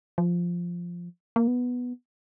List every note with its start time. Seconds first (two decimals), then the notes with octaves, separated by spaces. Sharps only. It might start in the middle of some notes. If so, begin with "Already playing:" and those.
0.18 F3
1.36 A#3
1.48 B3